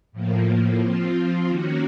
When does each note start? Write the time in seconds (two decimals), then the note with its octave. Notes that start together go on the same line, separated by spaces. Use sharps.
0.12 A2 F3 A#3
0.80 F3 C4 F4
1.49 D#3 A#3 C#4 F#4